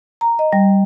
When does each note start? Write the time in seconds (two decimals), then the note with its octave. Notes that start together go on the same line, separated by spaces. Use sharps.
0.21 A#5
0.39 D#5
0.53 G3